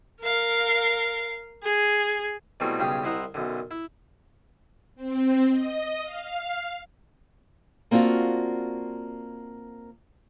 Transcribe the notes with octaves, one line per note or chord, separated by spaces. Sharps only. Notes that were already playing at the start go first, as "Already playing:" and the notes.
A#4 F5
G#4
B2 E3 F#3 G3 A3 C4
B1 G2 C#3 G4 G#4 G5
C2 E4 C5 D#5 F#5 A#5
B1 F#2 D3
E4
C4
D#5
F5
A#3 C4 D4 F4 F#4